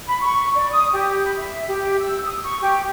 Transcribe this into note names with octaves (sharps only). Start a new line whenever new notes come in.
B5
C#6
D5
D#6
G4
B5
E5
G4
E6
D#6
C#6
G4